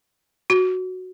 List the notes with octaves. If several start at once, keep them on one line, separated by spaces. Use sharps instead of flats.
F#4